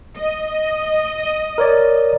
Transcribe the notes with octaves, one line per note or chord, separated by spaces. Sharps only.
D#5
A#4 C#5 D5